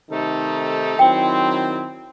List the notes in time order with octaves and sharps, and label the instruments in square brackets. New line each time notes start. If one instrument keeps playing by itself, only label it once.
[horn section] C3 D#3 A3 D#4 A4
[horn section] D#3 F#3 C4 E4 [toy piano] G5